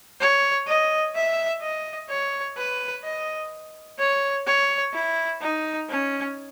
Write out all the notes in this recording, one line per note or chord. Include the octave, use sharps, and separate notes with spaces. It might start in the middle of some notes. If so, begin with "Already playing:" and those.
C#5
D#5
E5
D#5
C#5
B4
D#5
C#5
C#5
E4
D#4
C#4